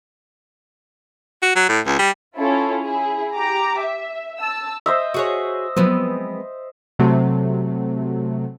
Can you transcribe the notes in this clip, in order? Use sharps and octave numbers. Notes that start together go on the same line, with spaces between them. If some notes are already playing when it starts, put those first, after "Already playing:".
F#4
F#3
A2
C#2
G3
C#4 E4 F4 A4
E4 G#4
G4 A#5 D6
E5
A5 E6
C5 D#5 E5
F#4 G#4 C#5
F3 F#3 G#3 B3 C4
C3 F#3 A3